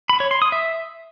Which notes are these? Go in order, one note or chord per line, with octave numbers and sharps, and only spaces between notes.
B5
C#5
C6
D#6
E5